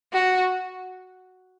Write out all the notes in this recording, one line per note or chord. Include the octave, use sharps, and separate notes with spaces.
F#4